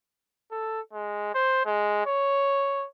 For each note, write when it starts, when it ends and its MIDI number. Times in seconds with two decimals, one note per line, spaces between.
0.51 0.80 69
0.93 1.30 56
1.34 1.63 72
1.66 2.06 56
2.06 2.86 73